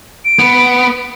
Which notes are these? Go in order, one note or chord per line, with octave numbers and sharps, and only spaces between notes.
D7
B3